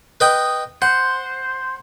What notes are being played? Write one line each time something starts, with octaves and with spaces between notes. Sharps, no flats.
B4 D#5 G5
C5 F#5